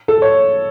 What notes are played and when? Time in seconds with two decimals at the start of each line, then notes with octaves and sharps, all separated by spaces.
0.08 A4
0.22 C#5